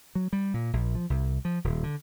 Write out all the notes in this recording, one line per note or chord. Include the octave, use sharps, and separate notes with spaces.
F#3
G3
A#2
A#1
F3
C2
F3
D#1
D3